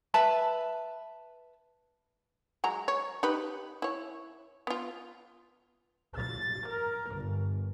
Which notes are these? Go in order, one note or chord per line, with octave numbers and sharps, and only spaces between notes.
B4 E5 A5 B5
F#3 G#3 A#5
C#5
D#4 G4 B4
E4 C#5
B3 F4
A6
A#4
G1